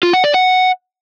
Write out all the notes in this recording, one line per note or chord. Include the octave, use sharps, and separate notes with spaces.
F4
F#5
D5
F#5